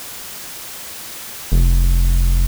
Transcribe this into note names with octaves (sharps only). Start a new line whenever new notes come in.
F1